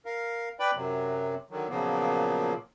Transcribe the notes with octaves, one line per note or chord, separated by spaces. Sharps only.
A#4 F5
B4 D5 G5 B5
F#2 C3 F#3
D3 D#3 F#3
A#2 C#3 F3 F#3 A#3 B3